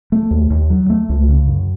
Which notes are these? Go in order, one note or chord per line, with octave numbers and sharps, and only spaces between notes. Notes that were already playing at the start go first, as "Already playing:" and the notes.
A3
D#2
D#2
F#3
A3
C#2
C#3
F#2